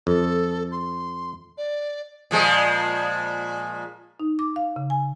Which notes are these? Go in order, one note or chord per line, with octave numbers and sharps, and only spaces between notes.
F2 A4
C6
D5
A#2 F3 G#3
D#4
D6
F5
C#3
G#5